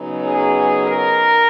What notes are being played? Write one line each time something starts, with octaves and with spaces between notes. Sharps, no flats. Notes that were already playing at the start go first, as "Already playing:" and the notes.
Already playing: C#3 F#3 B3 D#4
G#4
A#4